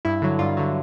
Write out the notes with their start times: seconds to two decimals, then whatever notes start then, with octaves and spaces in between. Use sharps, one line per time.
0.05 G2 E4
0.22 D3 F#3
0.39 G2 F4
0.57 D3 F#3